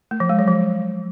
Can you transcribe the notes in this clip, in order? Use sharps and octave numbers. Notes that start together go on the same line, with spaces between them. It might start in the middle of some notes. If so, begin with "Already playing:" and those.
A3
F3
G#3
F#3
F3